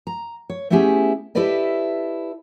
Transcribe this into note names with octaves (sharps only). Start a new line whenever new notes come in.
A#5
C#5
A3 B3 C#4 E4 G4 G#4
E4 G4 A4 B4 D5 D#5